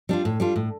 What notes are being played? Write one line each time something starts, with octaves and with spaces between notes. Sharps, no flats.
G3 D4 F4
A2
G3 D4 F4
A2